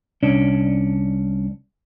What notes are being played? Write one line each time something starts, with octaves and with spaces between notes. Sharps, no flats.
C2 C#4 D4